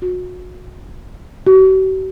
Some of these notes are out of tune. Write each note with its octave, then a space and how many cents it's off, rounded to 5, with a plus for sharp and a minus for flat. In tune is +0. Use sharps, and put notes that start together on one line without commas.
F#4 -30
F#4 +45